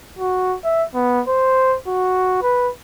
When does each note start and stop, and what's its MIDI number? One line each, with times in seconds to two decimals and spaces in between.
0.19 0.56 66
0.65 0.84 76
0.94 1.21 59
1.28 1.77 72
1.87 2.38 66
2.42 2.69 71